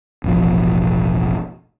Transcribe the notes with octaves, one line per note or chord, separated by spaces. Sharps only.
E1 A1 B2 F3